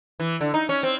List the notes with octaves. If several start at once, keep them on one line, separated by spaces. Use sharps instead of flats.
E3
D3
D#4
C#4
C4